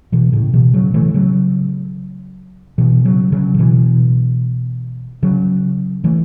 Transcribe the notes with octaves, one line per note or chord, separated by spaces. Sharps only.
B2 E3
A2 C#3
B2 E3
C#3 F#3
E3 A3
C#3 F#3
B2 E3
C#3 F#3
C#3 F#3
C#3
B2 E3
C#3 F#3
E3 A3